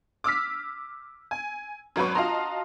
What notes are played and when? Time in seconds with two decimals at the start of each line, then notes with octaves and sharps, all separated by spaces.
0.24 D6 E6 F6 B6
1.31 G#5
1.96 G#1 F#3 C#4 B4 C#6
2.15 F4 F#4 D#5 A5 A#5 C6